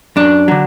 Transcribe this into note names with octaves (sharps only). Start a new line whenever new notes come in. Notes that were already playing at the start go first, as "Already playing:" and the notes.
F#2 D4
D3 F#3